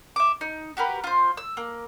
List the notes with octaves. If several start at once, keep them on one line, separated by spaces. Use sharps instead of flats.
E5 D6
D#4
F#4 G4 A#4 B4
F4 C5
E6
A#3